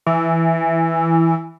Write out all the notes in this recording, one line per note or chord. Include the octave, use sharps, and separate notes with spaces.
E3